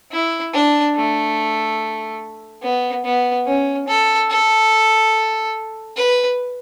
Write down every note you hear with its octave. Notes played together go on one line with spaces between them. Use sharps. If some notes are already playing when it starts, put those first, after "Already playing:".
E4
D4
A3
B3
B3
C#4
A4
A4
B4